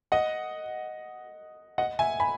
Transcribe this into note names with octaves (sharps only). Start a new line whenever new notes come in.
D#5 F#5
D#5 F#5
E5 G#5
G#5 B5